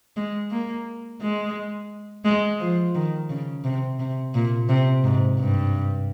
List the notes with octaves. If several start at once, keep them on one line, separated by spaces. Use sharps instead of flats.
G#3
A#3
G#3
G#3
F3
D#3
C#3
C3
C3
A#2
C3
G#2
G2